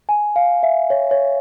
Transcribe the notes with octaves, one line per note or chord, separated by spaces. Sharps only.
G#5
F5
E5
C#5
C#5